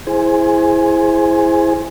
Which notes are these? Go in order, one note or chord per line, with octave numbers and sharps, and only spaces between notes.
E4 G#4 C5 G#5